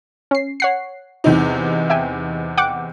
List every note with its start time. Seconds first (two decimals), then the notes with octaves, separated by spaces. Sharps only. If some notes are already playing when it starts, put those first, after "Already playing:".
0.31 C#4 C7
0.60 C#5 F#5 C7
1.24 E2 C3 D#4
1.90 E5 G5 G#5
2.57 F#5 G5 D6